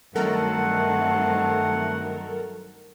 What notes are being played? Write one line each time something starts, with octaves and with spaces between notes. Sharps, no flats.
G2 D#3 F#3 A3 C4 A4 A#4 F#5